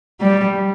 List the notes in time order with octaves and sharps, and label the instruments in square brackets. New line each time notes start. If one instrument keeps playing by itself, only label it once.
[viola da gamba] G3